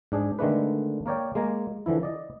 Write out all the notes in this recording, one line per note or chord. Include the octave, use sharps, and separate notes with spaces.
G#2 D4 G#4
D3 D#3 G#3 A3 D4 B4
A#3 A#4 C#5 D5 G5
G#3 A#3 G#5 A#5
D3 E3 F3 E4
D5 D#5